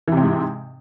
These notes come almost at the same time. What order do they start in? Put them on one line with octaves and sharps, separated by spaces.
E3 C3 C4 G#2